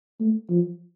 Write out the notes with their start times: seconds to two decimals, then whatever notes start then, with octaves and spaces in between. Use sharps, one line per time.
0.20 A3
0.50 F3